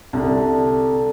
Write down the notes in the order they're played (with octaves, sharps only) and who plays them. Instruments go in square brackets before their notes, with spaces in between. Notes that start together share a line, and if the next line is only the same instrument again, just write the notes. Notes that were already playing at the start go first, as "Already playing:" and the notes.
[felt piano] C2 [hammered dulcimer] D3